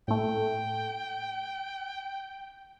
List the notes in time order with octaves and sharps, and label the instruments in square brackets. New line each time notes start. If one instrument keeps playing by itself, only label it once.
[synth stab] A2 A3 [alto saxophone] G5